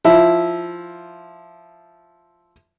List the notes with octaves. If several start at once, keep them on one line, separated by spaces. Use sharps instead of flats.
F3 E4